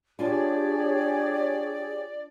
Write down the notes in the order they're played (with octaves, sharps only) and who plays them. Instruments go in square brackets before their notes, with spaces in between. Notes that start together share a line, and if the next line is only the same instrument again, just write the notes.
[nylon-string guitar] D4 F4 G#5 [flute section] G4 G#4 C#5 [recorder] D5